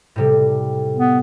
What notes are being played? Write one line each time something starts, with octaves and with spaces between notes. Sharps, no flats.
A2 C3 G3
B3